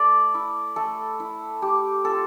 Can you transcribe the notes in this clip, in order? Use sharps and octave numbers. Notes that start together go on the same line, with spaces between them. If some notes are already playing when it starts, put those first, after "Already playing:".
Already playing: A3 D5
E4
A3 A4
E4
A3 G4
C4 F4 A4